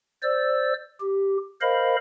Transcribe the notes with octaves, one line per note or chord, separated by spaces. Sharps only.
C5 D5 E6
G4
A#4 C5 D#5 F5 B5